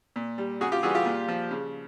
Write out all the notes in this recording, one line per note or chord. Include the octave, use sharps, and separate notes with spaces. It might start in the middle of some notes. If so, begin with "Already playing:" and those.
A#2
G3
C#3 F#4 G#4
F4 G4
E3 G3 F#4 G#4
F4 G4
A#2
F3
C#3